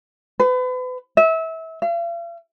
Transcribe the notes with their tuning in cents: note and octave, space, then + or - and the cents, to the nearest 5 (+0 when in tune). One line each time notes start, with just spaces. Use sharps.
B4 +35
E5 -25
F5 -45